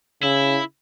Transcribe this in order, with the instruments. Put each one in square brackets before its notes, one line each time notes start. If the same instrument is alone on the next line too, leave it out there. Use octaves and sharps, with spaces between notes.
[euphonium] C#3 [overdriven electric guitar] E4